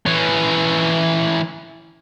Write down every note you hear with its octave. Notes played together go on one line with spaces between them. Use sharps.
E3 C#4